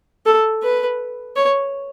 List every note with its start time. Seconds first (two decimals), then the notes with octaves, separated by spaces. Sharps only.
0.26 A4
0.63 B4
1.36 C#5